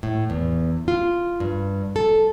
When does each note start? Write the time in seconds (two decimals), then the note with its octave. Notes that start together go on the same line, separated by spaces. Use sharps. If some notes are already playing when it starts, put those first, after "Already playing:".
0.03 A2
0.30 E2
0.88 F4
1.40 G2
1.96 A4